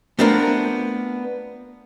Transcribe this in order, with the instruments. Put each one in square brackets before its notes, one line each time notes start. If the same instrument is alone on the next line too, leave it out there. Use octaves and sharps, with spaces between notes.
[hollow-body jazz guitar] A3 B3 C4 D4 F4 A#4